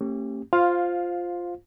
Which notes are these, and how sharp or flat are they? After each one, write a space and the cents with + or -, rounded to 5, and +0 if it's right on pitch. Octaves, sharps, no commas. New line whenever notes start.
A3 +40 C#4 -35 G4 +0
F4 +0 C5 +0 F5 +15